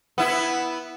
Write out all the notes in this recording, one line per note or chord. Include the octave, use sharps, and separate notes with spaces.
B3 E4